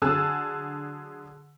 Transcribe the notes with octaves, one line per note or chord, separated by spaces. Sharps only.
D3 F#3 G#4 A5 E6